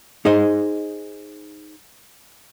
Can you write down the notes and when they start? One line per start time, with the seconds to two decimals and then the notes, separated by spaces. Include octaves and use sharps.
0.25 D#4 G#4 C5 D#5